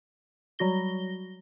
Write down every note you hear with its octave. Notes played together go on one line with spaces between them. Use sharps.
F#3 G3 F#4 A#6 G7